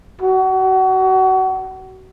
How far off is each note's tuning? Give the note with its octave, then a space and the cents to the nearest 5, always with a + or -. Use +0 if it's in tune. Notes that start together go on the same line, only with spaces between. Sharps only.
F#4 +30